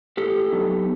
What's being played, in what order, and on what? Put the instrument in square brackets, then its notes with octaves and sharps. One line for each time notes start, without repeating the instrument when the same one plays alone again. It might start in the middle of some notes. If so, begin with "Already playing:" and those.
[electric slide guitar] A2 G4 A4
F#3 B3 D#4